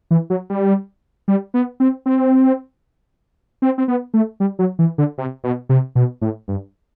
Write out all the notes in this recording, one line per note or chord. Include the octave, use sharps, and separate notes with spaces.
E3
F#3
G3
G3
B3
C4
C4
C4
C4
B3
A3
G3
F#3
E3
D3
C3
B2
C3
B2
A2
G2